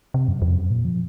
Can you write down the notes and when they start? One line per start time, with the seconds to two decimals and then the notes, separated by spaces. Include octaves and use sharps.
0.14 C3
0.28 F#2
0.42 F2
0.55 F#2
0.71 A#2
0.85 F3